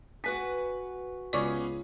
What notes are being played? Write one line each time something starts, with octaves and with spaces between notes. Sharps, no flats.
F#4 B4 G#5 B6
C#2 B3 C#4 G#4 D5 C#6 D6